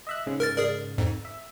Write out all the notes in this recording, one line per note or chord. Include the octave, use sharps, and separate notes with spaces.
D#5 E5 F#6
G#2 C#3 G#3
A#4 F6 A6
G#4 A#4 D5
F2 G#2
E5